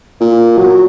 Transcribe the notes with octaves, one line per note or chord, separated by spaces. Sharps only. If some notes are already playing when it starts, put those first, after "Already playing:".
A#2
F#3